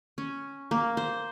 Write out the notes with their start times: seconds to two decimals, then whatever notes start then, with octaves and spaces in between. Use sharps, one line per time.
0.18 C#4
0.71 A#3
0.97 C5